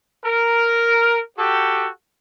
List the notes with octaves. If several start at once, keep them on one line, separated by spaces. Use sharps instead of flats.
A#4
F#4 G4 A4